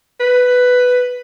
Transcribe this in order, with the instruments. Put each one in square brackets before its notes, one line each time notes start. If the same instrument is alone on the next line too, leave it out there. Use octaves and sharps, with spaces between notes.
[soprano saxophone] B4